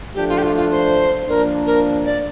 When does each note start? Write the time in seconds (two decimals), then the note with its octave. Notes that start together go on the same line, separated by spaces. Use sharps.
0.14 F3 A3 D4 G4
0.29 F4
0.38 G4
0.43 F4
0.56 F4
0.71 C5
1.28 F3 A#3 D4 A#4
1.66 A#4
2.05 D5